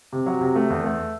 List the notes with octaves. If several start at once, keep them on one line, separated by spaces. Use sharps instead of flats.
C3
F#3
C3
A3
E2
A3